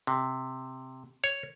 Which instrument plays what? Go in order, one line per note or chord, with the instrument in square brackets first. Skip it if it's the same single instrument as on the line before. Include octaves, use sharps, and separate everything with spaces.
[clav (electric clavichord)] C3
C#5